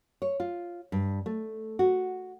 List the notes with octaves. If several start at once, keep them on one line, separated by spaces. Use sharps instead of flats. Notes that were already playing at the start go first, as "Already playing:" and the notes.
C#5
F4
G2
A3
F#4